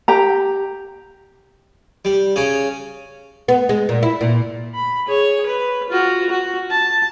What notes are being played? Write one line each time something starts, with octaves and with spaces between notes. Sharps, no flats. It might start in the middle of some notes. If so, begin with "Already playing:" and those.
G4 A#5
G3
C#3 C#4
B3
G#3
A#2
E4
A#2
B5
G#4 C#5
B4
F4 F#4
F#4
A5